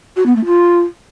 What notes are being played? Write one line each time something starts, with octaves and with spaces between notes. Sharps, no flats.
F#4
B3
A3
F4